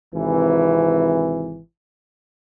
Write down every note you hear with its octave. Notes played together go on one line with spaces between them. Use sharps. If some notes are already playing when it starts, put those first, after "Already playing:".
G#1 C3 E3